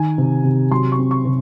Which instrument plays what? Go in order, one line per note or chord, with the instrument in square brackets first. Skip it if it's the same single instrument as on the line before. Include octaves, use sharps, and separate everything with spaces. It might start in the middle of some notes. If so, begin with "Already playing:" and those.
Already playing: [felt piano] D#3 G#5
C3
C3
F#3 C6
C#6
C4
C#6
C3